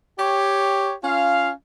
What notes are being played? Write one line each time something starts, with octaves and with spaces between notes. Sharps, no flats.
G4 C#5
C#4 F4 F5